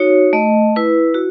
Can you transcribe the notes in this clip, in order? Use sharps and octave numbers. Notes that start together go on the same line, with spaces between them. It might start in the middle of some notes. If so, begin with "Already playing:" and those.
Already playing: D#4 F#4 C#5
A3 D#5
E4 B4
F#4